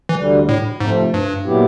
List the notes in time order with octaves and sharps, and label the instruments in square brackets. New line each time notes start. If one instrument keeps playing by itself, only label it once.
[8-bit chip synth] E3
[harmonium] D2 D3 G3
[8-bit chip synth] A2
[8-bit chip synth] G#2 [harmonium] C3 F3 A3 C4
[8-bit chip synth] G2
[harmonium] A#2 F#3 B3 E4 G4